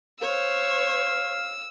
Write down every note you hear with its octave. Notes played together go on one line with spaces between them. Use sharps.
C5 C#5 F5 E6